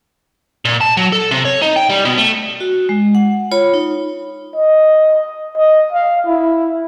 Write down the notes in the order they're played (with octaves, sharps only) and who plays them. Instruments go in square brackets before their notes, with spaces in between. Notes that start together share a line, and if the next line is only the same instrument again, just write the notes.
[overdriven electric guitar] A#2
A5
F#3
A4
C3
C#5
D#4
G5
G3
B2
A3
[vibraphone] F#4
G#3
F#5
F4 C#5 B5
D#4
[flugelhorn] D#5
D#5
F5
E4